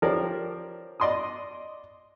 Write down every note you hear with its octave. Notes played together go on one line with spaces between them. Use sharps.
F3 C#4 G4 A#4 D5
D5 D#5 C6 D6 D#6